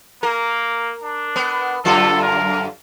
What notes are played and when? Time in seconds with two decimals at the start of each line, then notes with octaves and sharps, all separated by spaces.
0.23 A#3 A#4
1.03 D4
1.36 B3
1.85 F#2 D3 F4 A4
2.22 A#4